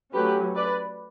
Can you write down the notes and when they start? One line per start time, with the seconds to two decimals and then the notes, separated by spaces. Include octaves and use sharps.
0.13 F#3 A3 C#4 G4 B4
0.55 B4 D5